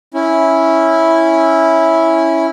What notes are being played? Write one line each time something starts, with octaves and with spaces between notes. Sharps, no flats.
C#4 E4